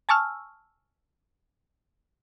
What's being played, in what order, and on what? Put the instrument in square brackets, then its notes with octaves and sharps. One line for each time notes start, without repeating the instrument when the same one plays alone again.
[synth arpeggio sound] G#5 A5 C#6 E6 F6